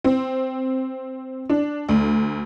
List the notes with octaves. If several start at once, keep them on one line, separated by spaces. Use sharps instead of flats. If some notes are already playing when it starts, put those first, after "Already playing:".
C4
D4
D2